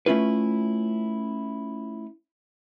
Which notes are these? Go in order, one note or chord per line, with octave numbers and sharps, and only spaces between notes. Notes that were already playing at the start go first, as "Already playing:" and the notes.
A3 C#4 E4 F4 B4